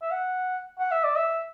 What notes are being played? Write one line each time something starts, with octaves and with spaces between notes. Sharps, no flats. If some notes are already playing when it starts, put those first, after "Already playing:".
E5
F#5
F#5
E5
D5
E5